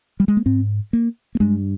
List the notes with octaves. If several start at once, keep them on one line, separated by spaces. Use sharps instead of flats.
G3
G#3
A#3
G#2 C4
A#3
A#3
G2 G#3